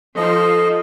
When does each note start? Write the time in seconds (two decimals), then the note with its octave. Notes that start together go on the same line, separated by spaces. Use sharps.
0.16 F3 D#4 A4 C5 D#5